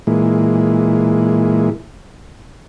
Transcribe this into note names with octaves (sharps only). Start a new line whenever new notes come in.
A#2 E3 G#3